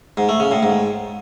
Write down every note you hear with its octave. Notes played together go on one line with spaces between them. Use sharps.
G#2
A3
C#3
A2
G#2